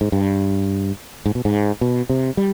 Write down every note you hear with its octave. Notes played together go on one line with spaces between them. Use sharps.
G#2
G2
G#2
B2
G#2
B2
C3
G3